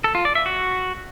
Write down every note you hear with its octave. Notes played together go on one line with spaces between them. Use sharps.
A4
F4
D5
E5
F#4